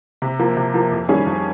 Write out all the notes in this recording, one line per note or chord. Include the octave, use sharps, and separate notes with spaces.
C3
F3 A#3
C3
F3 A#3
F2
D#3 G3 C#4 G#4
F2